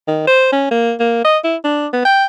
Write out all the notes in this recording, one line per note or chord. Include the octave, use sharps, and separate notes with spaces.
D#3
C5
C#4
A#3
A#3
D#5
E4
D4
B3
G5